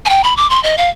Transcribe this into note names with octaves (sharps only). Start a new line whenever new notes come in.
G#5
G5
B5
D6
C6
D#5
F5